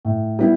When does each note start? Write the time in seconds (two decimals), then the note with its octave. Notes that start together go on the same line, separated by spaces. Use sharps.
0.05 A2
0.39 G3 B3 E4